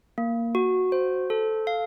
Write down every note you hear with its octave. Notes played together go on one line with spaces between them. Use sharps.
A#3
F#4
C5
A4
F5